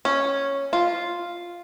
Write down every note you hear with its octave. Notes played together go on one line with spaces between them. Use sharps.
C#4
F4